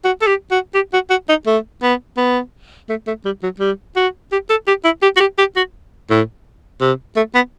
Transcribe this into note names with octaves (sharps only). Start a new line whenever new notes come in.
F#4
A4
G4
F#4
G4
F#4
F#4
D#4
A3
B3
B3
A3
A3
G3
F#3
G3
F#4
G4
A4
G4
E4
G4
F#4
G4
G4
F#4
A2
C3
A3
B3